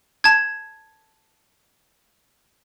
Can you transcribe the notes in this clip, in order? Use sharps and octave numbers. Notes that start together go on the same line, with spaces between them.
A5 G#6